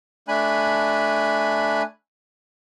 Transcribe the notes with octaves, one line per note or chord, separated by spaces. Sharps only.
A3 D4 G#5 B5 F#6